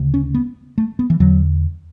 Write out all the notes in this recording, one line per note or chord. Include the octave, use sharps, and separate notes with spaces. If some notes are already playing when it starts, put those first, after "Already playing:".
Already playing: D2 C#3
C#4
B3
A3
B3
E3
E2 D3 F#3